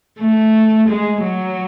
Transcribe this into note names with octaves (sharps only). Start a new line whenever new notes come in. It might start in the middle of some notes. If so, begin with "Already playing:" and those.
A3
G#3
F#3